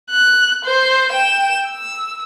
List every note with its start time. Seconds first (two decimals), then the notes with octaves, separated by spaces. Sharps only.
0.11 F#6
0.65 C5
1.10 G5 E7
1.68 E6